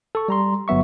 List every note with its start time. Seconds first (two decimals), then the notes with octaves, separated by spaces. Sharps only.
0.15 A4 C#6
0.28 G3 A#5 C6
0.68 G1 F#3 B3 E5 C#6